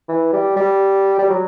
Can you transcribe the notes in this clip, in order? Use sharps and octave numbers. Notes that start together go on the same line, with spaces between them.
E3
G3
G3
G3
F#3